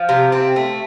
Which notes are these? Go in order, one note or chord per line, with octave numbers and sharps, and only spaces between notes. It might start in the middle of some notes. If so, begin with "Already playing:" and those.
Already playing: F3
C3
C4
A3